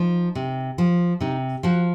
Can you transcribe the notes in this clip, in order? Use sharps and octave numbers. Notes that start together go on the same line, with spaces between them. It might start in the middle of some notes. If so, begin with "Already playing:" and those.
Already playing: F3 D#4
C3
F3
C3 D#4
F3 F#4